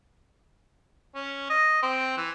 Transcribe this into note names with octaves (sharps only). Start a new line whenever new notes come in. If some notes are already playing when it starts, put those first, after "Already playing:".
C#4
D#5
C4
E3